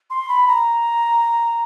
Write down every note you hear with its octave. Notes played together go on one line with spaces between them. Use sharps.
C6
B5
A#5